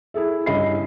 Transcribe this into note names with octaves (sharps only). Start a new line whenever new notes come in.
E4 G#4 A4 E5
G2 C#3 E4 D#5 B5 C7